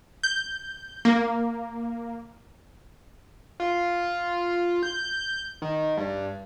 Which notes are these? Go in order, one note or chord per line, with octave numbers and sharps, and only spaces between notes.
G6
A#3
F4
G6
D#3
G2